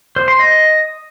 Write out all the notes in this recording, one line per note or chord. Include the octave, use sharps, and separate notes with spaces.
C5
C6
D#5